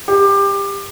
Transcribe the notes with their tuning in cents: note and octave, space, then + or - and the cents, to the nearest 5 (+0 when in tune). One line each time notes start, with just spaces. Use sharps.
G4 +20